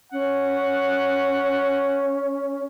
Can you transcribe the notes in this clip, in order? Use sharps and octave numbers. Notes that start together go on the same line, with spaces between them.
C#4 F#5